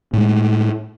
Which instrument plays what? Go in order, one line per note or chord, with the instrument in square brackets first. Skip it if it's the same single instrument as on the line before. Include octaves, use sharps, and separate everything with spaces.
[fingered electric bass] A2 G#3